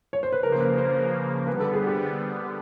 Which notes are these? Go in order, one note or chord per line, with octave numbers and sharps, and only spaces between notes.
C#5
C5
B4
C#3 F3 A#3 A#4
C5
B4
C5
D3 G3 B3 B4
A4
G#4
G4